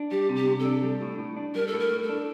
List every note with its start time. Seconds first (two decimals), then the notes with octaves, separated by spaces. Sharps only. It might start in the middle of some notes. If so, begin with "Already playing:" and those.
Already playing: D4
0.11 G3 G4
0.29 C3
0.35 G4
0.47 C3
0.59 A4
0.65 D4
0.82 G3
1.02 A2
1.18 A2
1.36 D4
1.55 G3 A#4
1.67 A4
1.73 A2
1.79 A#4
1.91 A2
2.02 A4
2.09 D4